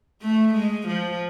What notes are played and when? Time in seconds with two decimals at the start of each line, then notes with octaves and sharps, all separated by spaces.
0.22 A3
0.54 G#3
0.87 F3